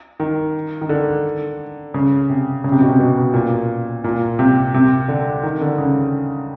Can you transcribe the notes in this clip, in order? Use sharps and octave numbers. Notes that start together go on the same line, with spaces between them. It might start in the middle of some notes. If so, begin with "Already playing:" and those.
D#3
D#3
D3
C#3
C3
C#3
C3
B2
C3
B2
A#2
A#2
C3
C3
D3
D#3
D3
C#3